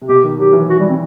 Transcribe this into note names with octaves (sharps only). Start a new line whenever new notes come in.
C3
B2 G4
D#3
F#3 G4
E3
F#4
G3
C4